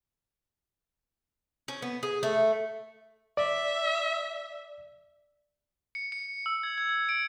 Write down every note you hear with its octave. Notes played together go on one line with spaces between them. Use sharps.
C#4
B3
G#4
A3
D5 E5
C#7
C#7
E6
G#6
G#6
G#6
D7